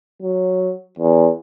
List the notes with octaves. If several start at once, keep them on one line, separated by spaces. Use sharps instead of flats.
F#3
E2